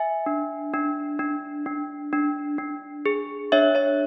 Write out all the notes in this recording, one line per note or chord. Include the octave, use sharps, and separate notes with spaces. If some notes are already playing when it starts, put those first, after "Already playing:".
Already playing: E5 G#5
D4
D4
D4
D4
D4
D4
G#4
D4 C#5 E5
C#5 E5